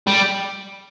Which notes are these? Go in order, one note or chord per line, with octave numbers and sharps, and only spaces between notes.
G3